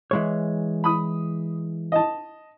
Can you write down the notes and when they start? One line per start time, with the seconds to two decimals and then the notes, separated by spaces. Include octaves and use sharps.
0.11 E3 G#3 C#5
0.84 B5 D#6
1.92 D#5 A5